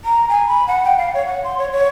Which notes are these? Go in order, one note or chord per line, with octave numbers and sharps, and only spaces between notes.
A#5
G#5
B5
F#5
G5
F5
C#5
F#5
C6
C#5
C#5